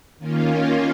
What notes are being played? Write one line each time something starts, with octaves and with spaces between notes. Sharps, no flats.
D#3 A#3 C#4 F4